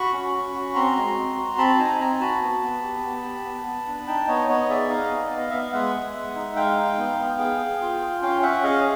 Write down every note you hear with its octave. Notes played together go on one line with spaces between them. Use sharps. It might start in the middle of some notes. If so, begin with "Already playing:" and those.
Already playing: F#4 B5 C#6
C#4
C#4
F#4
C4 A#5 C6
G#3
C4
F#4
C4 A5 B5
D#4 G#5 A#5
C4 G#5 A#5
F#4 A5 B5
B3
B3
G4
B3
G4
B3
B3
D4
D#4 G5 A5
B3 C#5 D#5
B3 C#5 D#5
G#4 D5 E5
D#4 D#5 F5
B3
D5
B3
D#5
B3 E5
F5
G#3 E5 F#5
G#3
G#3
D#4
G#3 F5 G5
D#4
B3
B3
G#4
G#4
F4
F4
C#4 F5 G5
C#4 E5 F#5
G#4 D#5 F5